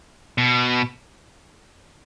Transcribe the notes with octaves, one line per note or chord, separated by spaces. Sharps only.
B2